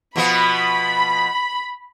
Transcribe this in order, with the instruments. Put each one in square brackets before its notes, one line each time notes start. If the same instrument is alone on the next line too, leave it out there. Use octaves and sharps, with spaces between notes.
[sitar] B2 F3 B3 [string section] B5